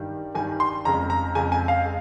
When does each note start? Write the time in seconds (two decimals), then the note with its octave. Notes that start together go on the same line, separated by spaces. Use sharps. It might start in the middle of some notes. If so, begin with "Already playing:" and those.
Already playing: G2 D#3 G3
0.35 G2 D#3 G3 G#5
0.60 C6
0.85 F2 C#3 G#3 A#5
1.10 A#5
1.35 F2 C#3 G#3 G#5
1.52 G#5
1.68 F5
1.85 G#3